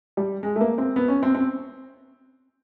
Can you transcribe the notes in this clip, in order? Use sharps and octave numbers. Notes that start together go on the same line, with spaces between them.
G3
G#3
A3
A#3
C4
B3
C#4
C4
C4